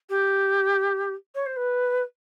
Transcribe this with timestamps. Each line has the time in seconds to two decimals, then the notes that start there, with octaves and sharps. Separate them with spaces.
0.09 G4
1.35 C#5
1.46 C5
1.56 B4